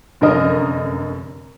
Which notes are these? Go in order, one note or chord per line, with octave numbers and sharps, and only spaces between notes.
F1 F#2 D3 A#4 D#5 D#6